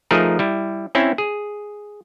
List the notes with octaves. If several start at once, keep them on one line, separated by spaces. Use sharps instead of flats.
F3 A3 D#4 G#4 A#4
G3 E4
C4 C#4 E4
G#4